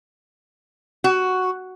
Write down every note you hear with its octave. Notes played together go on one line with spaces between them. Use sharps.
F#4